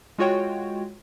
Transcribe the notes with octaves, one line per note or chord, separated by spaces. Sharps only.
G#3 F4 F#4 C#5 G5